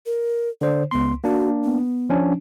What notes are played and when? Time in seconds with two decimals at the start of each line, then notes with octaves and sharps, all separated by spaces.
0.06 A#4
0.61 D3 C5 D5
0.91 C#2 B3 C6
1.24 A#3 D4 F#4
1.64 B3
2.09 F3 C#4 D4